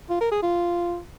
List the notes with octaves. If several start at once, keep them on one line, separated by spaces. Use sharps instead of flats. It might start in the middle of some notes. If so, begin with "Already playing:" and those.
F4
A#4
G#4
F4